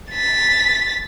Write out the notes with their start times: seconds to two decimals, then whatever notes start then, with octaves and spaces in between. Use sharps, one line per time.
0.12 A6 B6